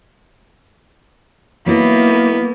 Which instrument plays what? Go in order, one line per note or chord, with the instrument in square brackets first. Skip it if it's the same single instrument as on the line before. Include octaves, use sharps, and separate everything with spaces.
[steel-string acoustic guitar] F#3 D#4 E4 [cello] A#3 [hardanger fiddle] B3